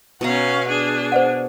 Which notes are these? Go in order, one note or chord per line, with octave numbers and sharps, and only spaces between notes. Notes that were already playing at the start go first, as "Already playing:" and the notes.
B2 B3 C#4 F5 F#5 A#5
D4 G#4
C5 D5 F#5